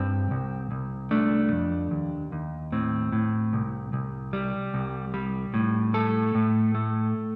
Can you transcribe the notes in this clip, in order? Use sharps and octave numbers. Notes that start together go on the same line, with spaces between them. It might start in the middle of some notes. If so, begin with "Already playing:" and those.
Already playing: G2 C4
C2
C2
A3 D4
F2
D#2
D#2
A2 C4
A2
C2
C2
G3
C2
G3
A2
A3 A4
A2
A3